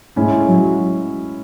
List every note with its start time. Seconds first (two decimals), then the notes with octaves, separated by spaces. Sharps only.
0.16 A2 G#3 C#4 E4
0.46 F#3